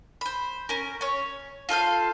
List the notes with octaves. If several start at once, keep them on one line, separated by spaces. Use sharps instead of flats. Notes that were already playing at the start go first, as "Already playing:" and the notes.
C5 B5
C#4 A#4
C#4 C#5
F4 A4 C5 F5